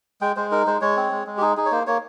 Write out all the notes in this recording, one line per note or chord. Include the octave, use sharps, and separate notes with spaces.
G#3 G5
G#3 C5
D#4 A#4
G#3 C5
G#3 C#5
C4
G#3
G#3
G4
D#4 G#4
D#4 G#4
C#5
A#3 C5
A#3 C#5